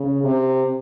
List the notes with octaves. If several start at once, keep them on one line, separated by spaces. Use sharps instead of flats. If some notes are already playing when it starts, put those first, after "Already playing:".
Already playing: C#3
C3